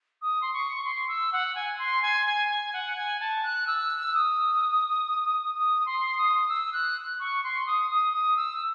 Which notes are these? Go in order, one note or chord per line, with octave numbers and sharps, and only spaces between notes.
D#6
C6
C#6
C6
E6
F#5
G#5
C6
G#5
G#5
G#5
F#5
G#5
A5
F#6
E6
D#6
D#6
C6
D#6
E6
F#6
C#6
C6
D#6
D#6
D#6
E6